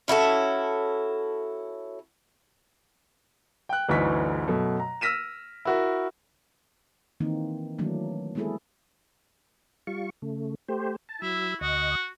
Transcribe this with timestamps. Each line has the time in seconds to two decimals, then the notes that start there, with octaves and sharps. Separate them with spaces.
0.08 C#4 E4 F#4 A4
3.69 G5 F#6
3.89 G1 D2 E3 D#4 C#6 B6
4.47 F#2 B2 A3
4.80 A#5
5.01 E6 F6 A#6 B6 D#7 E7
5.65 E4 F#4 A#4
7.20 D#3 E3 A#3 C4 D#4
7.79 D#3 E3 F#3 A3 A#3 D4
8.35 G#3 A#3 B3 E4 G#4 A4
9.87 G3 F4 C#6
10.22 C#3 A3
10.68 A3 G4 C5
11.09 A5
11.22 F#3 E4 E6
11.61 D2 F#4 D#5